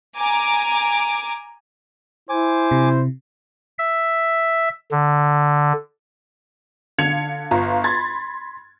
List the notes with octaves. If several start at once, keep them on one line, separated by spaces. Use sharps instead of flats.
G#5 A#5 D6
E4 C5 G#5 D6
C3
E5
D3
D3 F5 G#6 C#7 F7
G1 F4 A#5
B5 C6 G#6 A6